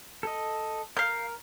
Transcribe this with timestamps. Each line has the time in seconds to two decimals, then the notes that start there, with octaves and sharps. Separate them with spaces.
0.23 A4 D#5
0.97 A#4 F5 G6